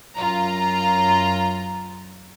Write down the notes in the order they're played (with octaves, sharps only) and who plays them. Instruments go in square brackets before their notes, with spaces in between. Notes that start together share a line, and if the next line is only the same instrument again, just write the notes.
[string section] F#2 F4 A#5